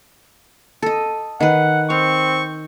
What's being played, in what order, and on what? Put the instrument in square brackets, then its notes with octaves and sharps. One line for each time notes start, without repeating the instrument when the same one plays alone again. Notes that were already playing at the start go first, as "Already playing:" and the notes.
[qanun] A4 D#5
[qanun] D#3 B4 [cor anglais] F#5
[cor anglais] C4 [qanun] F5 [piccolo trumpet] C#6